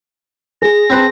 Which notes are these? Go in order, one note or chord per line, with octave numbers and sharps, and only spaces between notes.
G#4 A#6
C4 B4 A5